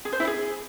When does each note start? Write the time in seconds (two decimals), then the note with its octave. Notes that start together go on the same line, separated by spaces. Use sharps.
0.05 G#4
0.13 C5
0.20 E4
0.27 G#4